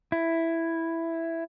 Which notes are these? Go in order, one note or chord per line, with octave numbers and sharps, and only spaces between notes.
E4